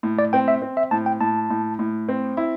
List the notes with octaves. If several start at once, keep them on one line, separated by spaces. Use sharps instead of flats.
A2
D5
C4 G5
E5
C4
E5
A2 A5
G5
A2 A5
A2
A2
C4
E4